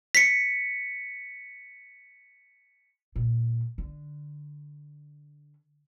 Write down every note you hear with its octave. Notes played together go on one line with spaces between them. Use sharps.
B6 C#7
A#2
D3